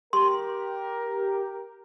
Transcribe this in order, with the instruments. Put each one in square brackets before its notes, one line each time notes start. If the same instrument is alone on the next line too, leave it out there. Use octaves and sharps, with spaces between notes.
[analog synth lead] G4 [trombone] A#4 [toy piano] C6